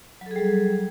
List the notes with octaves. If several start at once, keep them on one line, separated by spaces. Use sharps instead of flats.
F#3 G3 G#4 A4